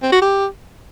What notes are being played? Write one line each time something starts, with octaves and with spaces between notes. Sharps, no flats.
C4
F#4
G4